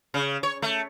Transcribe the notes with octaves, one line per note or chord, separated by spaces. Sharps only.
C#3
C#5
A3